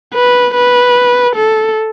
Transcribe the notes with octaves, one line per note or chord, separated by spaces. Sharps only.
B4
B4
A4